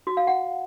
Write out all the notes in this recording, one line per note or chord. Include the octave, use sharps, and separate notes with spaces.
F#4
F5
F#5